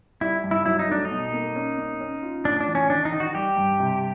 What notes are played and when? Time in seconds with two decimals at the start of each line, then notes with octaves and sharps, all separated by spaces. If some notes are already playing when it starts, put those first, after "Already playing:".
0.21 G3 E4
0.44 G2
0.51 E4
0.66 F#3 E4
0.79 D#4
0.88 A3 D4
1.05 D#4
1.11 B2
1.34 A#3
1.56 C#4
1.79 C#4
2.01 C#4
2.23 F4
2.45 A2 D4
2.60 D4
2.67 E3
2.75 C#4
2.90 D#3 D4
3.05 D#4
3.12 D#3
3.20 F#4
3.35 G3 G4
3.57 G2
3.80 C3